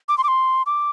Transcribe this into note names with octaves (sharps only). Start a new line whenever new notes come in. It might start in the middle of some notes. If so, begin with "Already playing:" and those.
D6
C6
D6
C6
D6